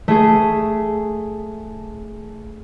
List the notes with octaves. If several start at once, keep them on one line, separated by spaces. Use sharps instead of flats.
A3 G#4